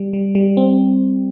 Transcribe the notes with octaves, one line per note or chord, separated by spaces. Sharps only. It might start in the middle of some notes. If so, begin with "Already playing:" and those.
Already playing: G3
G3
G3
C4